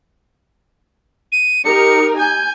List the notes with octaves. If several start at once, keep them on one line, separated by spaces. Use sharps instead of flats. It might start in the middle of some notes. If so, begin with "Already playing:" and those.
D#7
D#4 G4 A#4 C#7
G#5 G6